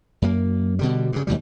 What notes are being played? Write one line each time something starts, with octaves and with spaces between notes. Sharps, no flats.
F#2 A#3
B2 D3 G3
G2 C#3
D#2 G#2 B2 G3